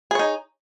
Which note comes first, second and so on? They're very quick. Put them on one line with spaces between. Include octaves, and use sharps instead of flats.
G#4 C#5 D#4